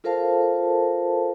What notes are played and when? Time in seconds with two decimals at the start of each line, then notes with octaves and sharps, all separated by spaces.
0.04 F4 A4 A#4 C5 F5 A5